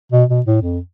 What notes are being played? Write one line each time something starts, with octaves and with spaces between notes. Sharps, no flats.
B2
B2
A2
F2